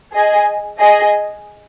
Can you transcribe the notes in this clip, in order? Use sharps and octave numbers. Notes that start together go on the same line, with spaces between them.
G#4 D#5 G#5
G#4 D#5 G#5